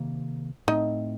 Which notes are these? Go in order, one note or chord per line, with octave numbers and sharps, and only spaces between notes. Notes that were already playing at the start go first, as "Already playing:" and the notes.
Already playing: C3 D#3 A#3
A2 A3 C4 D#4 D#5